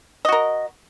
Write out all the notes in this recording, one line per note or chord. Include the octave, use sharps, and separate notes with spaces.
F#4 A#4 D#5